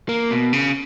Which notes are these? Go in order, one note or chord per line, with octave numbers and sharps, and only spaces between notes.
A#3
B2
C#3